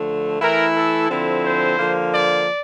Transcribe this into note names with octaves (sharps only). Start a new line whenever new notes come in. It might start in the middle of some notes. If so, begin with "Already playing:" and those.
Already playing: D3 F3 A3
E3 A3 E4 A#4
A4
D3 F3 C4 E4
C5
D3 F3 A#3
D5